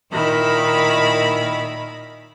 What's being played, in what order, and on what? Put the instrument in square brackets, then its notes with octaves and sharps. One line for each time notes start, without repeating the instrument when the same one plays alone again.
[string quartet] A#2 D#3 E4 B5